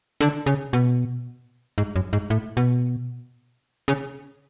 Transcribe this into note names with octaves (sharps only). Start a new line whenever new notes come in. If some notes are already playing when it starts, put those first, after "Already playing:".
D3
C#3
B2
G#2
F#2
G#2
A2
B2
C#3